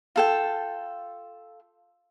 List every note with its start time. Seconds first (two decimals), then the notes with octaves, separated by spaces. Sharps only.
0.16 F4 A4 G5